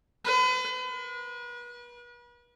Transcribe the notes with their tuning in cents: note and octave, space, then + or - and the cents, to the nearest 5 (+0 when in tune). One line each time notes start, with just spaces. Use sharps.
B4 +40
B4 -40